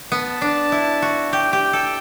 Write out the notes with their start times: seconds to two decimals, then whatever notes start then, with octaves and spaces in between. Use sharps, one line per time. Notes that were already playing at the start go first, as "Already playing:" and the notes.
0.12 B3 A5
0.42 D4
0.72 E4
1.02 F#4
1.32 G4 G5
1.53 G4
1.73 A4